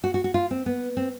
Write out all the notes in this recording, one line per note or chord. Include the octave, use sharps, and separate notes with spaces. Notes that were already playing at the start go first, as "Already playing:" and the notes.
F#4
F#4
F#4
F4
C4
B3
C4